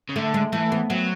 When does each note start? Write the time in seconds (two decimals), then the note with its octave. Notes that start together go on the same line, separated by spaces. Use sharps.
0.09 C#3
0.16 D3 A3
0.34 G#3
0.53 E3 A3
0.72 B3
0.90 F#3 B3